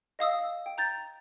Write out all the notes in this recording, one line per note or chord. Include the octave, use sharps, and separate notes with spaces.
D#5 F5 D#6 E6
G5
A#5 G6 A6